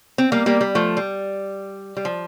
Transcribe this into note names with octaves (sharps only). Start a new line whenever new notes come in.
C4
G3 A#3
G3 A#3
G3
F3 A3
G3
G3
F3